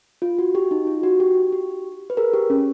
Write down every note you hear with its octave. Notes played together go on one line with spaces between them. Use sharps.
F4
F#4
G4
D#4
F4
F#4
G4
G4
B4
G#4 A#4
G4
C#4